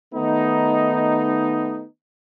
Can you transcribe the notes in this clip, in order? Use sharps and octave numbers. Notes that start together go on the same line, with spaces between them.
D#3 A3 B3 D#4